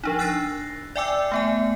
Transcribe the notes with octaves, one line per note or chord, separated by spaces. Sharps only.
F3 D4 D#4
E6 F#6 A6 A#6 C7
D5 E5 G5 G#5 D6 E6
A3 B3 G#5